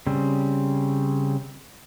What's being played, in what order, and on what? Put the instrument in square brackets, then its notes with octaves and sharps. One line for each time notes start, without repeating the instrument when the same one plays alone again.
[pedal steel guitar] C#3 G3 C4